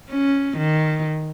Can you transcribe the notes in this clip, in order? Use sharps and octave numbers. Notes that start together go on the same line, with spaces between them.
C#4
D#3